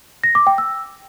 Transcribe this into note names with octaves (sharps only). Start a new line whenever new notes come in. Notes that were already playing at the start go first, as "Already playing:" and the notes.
A#6
D6
G5
E6